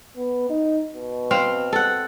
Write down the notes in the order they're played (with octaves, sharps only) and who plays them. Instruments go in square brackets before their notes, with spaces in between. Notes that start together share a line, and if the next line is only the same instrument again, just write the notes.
[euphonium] B3
D#4
B2
[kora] C4 F5
A4 F#5